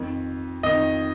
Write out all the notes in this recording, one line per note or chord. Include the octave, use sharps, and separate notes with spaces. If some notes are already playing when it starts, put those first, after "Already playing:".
Already playing: F2 D#3
F2 D#3 D#5